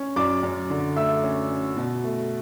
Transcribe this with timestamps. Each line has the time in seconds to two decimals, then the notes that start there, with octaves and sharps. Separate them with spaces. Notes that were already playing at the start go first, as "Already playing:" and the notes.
Already playing: C#4
0.16 F#2 D5 D6
0.43 F#2
0.70 D3
0.96 A3 E5 E6
1.23 C#4
1.50 C#4
1.77 B2
2.04 A3